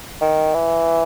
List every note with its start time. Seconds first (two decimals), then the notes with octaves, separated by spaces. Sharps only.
0.21 D#3
0.54 E3